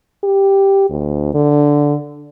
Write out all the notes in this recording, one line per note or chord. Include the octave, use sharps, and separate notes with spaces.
G4
D2
D3